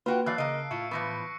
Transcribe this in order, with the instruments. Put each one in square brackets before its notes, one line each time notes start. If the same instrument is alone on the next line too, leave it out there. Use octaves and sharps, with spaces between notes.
[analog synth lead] A#3 [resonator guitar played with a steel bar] F4 F#4 G5 [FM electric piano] B4
[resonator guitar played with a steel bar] E3 F#3 D5 [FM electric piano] F5 A5 [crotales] E6 F#6 C7
[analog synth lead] C#3 [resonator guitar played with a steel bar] A#3 D#5 [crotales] D7
[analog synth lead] A2 [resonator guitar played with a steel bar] E4 F4 [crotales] C#6 C#7
[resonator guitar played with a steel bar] E3 F3 B3 [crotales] C#6 A#6 C#7